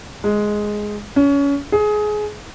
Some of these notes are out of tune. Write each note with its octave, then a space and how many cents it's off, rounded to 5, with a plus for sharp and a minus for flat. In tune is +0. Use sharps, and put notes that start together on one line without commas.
G#3 +5
C#4 +25
G#4 +20